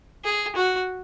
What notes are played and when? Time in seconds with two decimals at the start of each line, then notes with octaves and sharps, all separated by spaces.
0.24 G#4
0.56 F#4